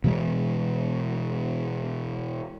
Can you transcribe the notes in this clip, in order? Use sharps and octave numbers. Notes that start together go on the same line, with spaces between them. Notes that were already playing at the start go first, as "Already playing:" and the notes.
B2 E3 G#3